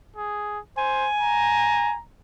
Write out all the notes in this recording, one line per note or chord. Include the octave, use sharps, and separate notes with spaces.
G#4
C5 G#5
A#5